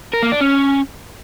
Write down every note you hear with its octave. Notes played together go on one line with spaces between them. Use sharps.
A#4
A#3
D4
C#4